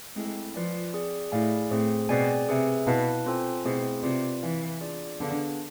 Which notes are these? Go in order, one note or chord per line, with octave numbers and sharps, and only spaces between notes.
G#3 A3 C4 E4 A4
F3 F4 B4 D5 G#5
C4 G#4 D5
A2 E4 G#4 D5 F5 G#5
A2 C4 G#4 C5
B2 C4 G#4 D5 G#5
C3 G#4 B4 E5 G#5
B2 E4 B4 F5 A5
C4 F4 A4 C5 G#5
B2 A3 C4 E4 G#4 C5
C3 F4 B4 D5
E3 E4 B4 F5 G#5
B3 D4 F4 G#4 D5
D3 B3 D4 G#4 B4 F5